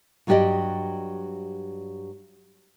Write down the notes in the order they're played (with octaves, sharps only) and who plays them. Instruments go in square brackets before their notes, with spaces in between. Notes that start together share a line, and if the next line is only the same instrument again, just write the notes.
[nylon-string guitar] G2 F#3 F4 G4 D5 D#5